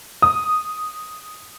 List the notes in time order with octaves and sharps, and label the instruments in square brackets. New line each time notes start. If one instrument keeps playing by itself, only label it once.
[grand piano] D#6